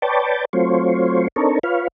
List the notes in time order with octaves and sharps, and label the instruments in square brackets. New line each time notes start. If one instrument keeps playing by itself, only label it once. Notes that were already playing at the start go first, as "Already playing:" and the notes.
[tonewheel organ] B4 C#5 D5 G5 A5
F#3 A3 C4 F4 C5 C#5
C4 D4 D#4 A4 A#4 C#5
F4 B4 C#5 F5